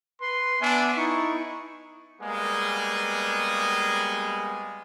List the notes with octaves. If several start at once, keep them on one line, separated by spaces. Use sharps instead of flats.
B4 C6
B3 D4 E5 G#5
D#4 E4 C#6
G3 G#3 A#3 B3 G#4